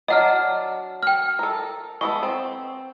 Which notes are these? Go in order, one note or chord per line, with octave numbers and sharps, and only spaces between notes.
F#3 D4 D5 D#5 F#5 F6
G5 F6
A4 A#4
G#3 B3 A4 C#6
C4